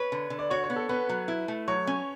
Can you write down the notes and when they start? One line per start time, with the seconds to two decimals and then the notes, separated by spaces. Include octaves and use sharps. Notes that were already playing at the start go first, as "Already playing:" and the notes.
Already playing: B4 C#5
0.12 D3
0.30 D3
0.39 D5
0.50 F#4 C#5
0.64 C#5
0.70 B3
0.76 A4
0.89 B3 B4
1.09 F#3
1.28 E4
1.48 A3
1.68 F#3 C#5
1.87 C#4